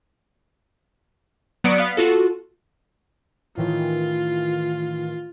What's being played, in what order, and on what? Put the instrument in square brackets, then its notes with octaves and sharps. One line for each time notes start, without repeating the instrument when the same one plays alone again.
[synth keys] F#3 B3 D5 D#6 C#7 D7
B3 F5 B6
F4 F#4 A4
[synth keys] A2 D#3 E3 [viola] F4